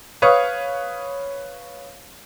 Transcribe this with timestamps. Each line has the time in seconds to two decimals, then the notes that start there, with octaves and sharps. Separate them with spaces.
0.22 B4 C#5 F5 C#6 D#6